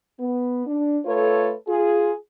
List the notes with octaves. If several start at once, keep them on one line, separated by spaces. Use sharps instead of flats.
B3
D4
A3 F4 A4 B4 C#5
F4 G#4